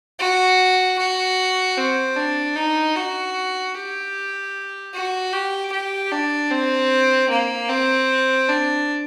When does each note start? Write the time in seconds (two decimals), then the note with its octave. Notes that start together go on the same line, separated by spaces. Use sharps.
0.19 F#4
0.98 F#4
1.77 C4
2.17 D4
2.56 D#4
2.96 F#4
3.75 G4
4.93 F#4
5.32 G4
5.72 G4
6.12 D4
6.51 C4
7.30 A#3
7.69 C4
8.49 D4